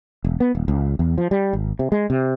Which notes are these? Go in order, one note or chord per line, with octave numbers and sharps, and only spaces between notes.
E1
B3
D#1
C#2
E2
F3
G3
G#1
C3
G#3
C3